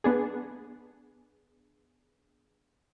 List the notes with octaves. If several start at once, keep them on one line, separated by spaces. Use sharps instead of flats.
B3 D4 G#4